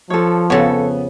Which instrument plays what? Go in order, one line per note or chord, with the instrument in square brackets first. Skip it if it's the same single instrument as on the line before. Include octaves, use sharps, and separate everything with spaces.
[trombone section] F3 [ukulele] A4 C#5
[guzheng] F2 C#3 [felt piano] B3 [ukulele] A4 C#5